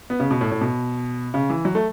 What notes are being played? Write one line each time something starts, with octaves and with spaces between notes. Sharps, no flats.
B3
C#3
B2
A2
A2
B2
C#3
E3
F#3
A3